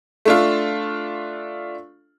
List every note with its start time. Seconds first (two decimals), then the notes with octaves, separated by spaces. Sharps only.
0.25 A3 D4 F4